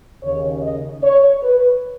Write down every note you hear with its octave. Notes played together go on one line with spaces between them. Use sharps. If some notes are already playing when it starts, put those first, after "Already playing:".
D#2 C#3 C#5
D#5
C#5
B4